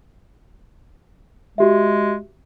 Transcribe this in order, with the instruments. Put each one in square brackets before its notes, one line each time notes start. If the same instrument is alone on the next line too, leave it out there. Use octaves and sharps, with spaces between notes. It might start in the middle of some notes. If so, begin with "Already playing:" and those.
[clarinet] G#3 [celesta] F#4 G4 E5